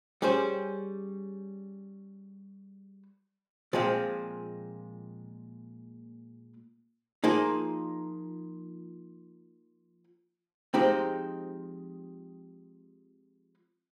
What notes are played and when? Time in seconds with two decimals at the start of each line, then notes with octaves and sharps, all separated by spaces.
0.22 G3 C#4 G#4 C5
3.73 A#2 F3 G#3 C4
7.24 F3 A#3 D#4 G#4
10.74 F3 G#3 C4 D#4 G4